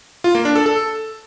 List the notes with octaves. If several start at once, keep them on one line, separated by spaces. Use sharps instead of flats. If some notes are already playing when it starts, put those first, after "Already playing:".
F4
A#3
D4
A4
A4